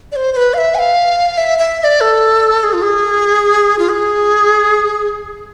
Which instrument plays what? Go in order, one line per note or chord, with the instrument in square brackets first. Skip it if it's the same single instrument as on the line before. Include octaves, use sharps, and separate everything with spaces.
[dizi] D5
C5
C5
B4
F5
E5
G#5
F5
E5
E5
E5
D5
A4
G#4
F4
G#4
F4
G#4